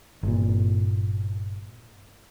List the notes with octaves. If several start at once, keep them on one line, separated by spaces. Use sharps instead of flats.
G1 A#2